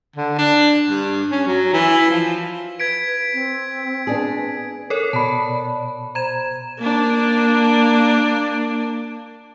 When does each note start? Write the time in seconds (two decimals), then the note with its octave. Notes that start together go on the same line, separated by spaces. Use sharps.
0.16 D3
0.38 D4
0.89 G2
1.31 C#4
1.47 F#3
1.73 E3
2.11 F3
2.80 B4 G#6 B6 D7
3.34 C4
4.07 B3 D4 G#4
4.90 A4 A#4 C#5
5.13 B2 D5 A5 B5
6.15 C5 A#5 G#6 E7
6.79 A#3 D4